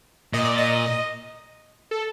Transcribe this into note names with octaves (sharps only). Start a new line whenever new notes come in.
A#2 D#5
D5
D#5
A4